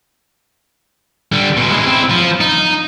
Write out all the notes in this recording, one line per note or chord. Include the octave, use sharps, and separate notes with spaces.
D3 G3
B2 G#3
G#3 E4
C4 E4
F3
D#4